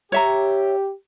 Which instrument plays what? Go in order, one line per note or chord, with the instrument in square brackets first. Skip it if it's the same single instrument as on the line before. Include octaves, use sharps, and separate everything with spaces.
[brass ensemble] G4 [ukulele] C#5 E5 A#5